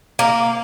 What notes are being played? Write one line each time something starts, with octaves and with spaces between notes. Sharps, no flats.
A#3